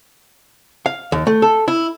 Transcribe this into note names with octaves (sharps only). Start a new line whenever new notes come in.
F5
D#2
A3
A4
E4